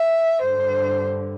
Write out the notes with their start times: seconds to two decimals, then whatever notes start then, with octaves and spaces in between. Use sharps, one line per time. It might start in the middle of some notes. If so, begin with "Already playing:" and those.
Already playing: E5
0.42 G2 D3 C5